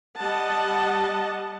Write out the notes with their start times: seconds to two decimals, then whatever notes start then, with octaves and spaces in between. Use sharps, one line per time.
0.18 G3 D#5 F#5 A5